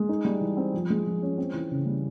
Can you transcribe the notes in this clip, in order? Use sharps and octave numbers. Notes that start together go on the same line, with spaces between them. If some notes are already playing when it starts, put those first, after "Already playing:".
Already playing: G#3
D#4
G3
E3
C4
F3
G#3
F3
C#4
C4
E3
C#3
G3